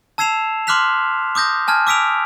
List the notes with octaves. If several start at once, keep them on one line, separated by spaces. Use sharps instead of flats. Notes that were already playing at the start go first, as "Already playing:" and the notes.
A5 E6 G#6 C7 E7 F7
C6 D6 F6 F#6 B6 F7
D6 D#6 G6 A#6
G#5 A5 F6 G#6
D6 E6 B6 D7 F7